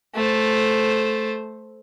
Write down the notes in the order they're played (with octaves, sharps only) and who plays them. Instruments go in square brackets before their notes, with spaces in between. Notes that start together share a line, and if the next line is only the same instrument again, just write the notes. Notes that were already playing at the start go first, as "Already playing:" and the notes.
[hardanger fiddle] A3 C5